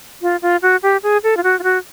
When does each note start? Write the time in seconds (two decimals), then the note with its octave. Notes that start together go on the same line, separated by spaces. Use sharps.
0.22 F4
0.42 F4
0.62 F#4
0.83 G4
1.03 G#4
1.23 A4
1.37 F4
1.44 F#4
1.59 F4
1.63 F#4